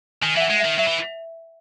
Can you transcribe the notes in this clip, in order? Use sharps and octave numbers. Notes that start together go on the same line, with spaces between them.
D#3 G#5
E3 E5
F#5
G#3
D#3 E5
F#3 E5
E3